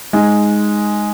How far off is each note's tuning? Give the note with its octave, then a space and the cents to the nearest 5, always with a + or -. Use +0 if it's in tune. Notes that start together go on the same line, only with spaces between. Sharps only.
G#3 +0 D#4 +0